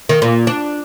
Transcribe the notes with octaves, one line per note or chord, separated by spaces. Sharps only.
D#3
A#2
D4